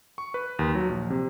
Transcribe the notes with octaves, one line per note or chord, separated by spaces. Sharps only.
C#6
B4
D#2
F#3
A#1
C3